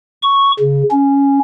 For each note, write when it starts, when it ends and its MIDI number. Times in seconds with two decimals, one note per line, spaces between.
0.22 0.52 85
0.59 0.83 49
0.91 1.39 61